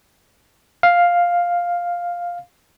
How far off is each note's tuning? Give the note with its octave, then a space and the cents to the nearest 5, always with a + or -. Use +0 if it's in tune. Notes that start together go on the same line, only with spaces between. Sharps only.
F5 +5